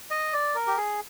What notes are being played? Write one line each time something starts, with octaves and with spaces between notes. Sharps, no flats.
D#5
D5
A#4
G4
G#4